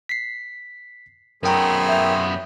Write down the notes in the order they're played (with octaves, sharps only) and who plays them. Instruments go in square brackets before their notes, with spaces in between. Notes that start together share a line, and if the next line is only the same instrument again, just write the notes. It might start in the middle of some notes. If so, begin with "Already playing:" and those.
[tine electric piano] B6 C7
[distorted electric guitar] F#2 B3 [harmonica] A3 C4 G#4 [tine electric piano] A#4 G5 A#5
[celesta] E5 G6 F7